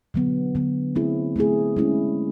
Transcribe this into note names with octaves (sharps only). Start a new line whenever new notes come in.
D3 F#3 B3
D3 F#3 B3
A3 C4 E4 G#4
A3 C4 E4 G#4
G#3 C#4 E4